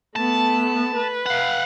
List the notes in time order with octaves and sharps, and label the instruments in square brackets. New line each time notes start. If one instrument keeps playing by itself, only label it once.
[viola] A3 B3 [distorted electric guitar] A5
[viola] B4
[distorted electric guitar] F5 F#5